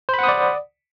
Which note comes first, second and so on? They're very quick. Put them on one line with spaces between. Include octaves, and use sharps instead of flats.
C5 B5 F#5 D#6 D5